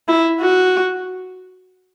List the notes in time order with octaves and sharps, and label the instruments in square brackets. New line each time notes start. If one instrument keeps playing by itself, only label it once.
[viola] E4
F#4